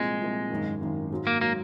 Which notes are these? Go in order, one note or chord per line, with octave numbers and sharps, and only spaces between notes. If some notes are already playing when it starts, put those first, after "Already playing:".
Already playing: C2 A#2 F3 G#3 C4
C2 A#2 F3 C4
G#1 F#2 D#3
G#1 F#2 D#3
G#1 G#2 F#3
A#3
F#3 A#3